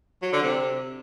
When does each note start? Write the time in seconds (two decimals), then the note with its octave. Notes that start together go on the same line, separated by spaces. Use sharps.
0.22 F#3
0.32 D3
0.43 C3